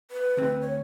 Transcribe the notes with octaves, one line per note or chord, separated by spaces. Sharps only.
B4
D2 C4
C#5